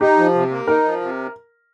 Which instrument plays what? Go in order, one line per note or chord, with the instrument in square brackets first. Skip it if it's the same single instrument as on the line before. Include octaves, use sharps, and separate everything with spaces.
[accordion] D#4 [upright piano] G4
[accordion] F3
C3
A#3
[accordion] D#4 [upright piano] A#4
[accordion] F3
C3